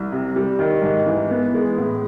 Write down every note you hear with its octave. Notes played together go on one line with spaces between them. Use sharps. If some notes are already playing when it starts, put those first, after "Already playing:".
Already playing: C2
C3
G3
D#3
G#2
E3
B3
G#3
A2